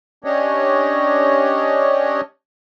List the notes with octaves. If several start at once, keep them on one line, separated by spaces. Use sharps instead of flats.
C#4 D4 G4 C#5 D#5